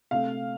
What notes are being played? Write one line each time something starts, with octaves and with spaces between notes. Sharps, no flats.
C3 A3 F5